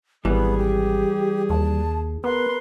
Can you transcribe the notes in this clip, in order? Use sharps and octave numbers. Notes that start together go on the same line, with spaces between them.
G#1 E3 G3 B3 G#4
G4
D#2 A5
B3 A#4 B4 C6